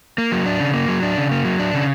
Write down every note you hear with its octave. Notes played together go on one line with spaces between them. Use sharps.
A#3
F#3
D4
C#3
A#3
F#3
D4
C#3
A#3
F#3
D4
C#3